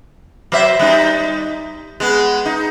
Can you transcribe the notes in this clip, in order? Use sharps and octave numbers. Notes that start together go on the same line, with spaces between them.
F#3 C5 E5
G3 D#4
G#3 B3
D#4